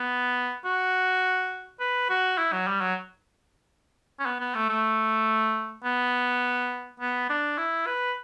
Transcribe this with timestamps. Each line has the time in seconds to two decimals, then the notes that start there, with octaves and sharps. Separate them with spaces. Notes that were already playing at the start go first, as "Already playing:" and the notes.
Already playing: B3
0.65 F#4
1.80 B4
2.09 F#4
2.38 E4
2.52 F#3
2.67 G3
2.81 F#3
4.19 C#4
4.25 B3
4.40 B3
4.55 A3
4.69 A3
5.84 B3
7.00 B3
7.29 D4
7.58 E4
7.86 B4